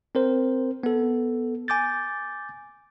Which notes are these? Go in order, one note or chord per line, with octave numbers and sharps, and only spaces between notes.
C4 A#4 C5
B3 A4
G#5 D6 G6 A6